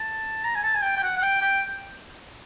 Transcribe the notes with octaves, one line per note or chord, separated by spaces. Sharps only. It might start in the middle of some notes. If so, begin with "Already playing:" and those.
Already playing: A5
A#5
G#5
A5
G#5
G5
G5
F#5
F#5
G5
G5